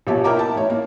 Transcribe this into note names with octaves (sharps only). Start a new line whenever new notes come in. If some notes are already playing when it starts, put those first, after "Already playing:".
A#1 B2 G4 C#5 A5
E4 A#4 D#5 G5 A#5 D6
E4 A5
A1 C#5
A#3